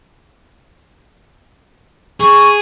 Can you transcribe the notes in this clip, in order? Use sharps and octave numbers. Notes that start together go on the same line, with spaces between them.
G#4 C#6